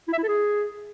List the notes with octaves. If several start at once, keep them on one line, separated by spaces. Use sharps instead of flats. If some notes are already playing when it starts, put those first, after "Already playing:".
E4
E5
E4
A4
G#4